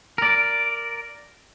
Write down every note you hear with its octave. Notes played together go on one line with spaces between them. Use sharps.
A#4 D5